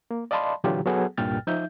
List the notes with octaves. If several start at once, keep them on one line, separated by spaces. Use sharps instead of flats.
A#3
D5 D#5 F5 A5 B5 C6
A#2 D3 E3 F#3 F4 G4
F#3 B3 G#4 A4 F#5
C2 G2 A#2 G5 F6 A6
F3 D#4 E5 G6